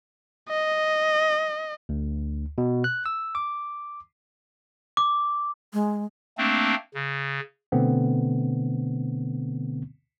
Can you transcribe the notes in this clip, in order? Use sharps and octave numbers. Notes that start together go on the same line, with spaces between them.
D#5
D2
B2
F#6
E6
D6
D6
G#3
A3 A#3 C4 D4
C#3
B2 D3 A3 B3 C4